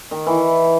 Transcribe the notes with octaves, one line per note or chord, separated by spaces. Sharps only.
D#3
E3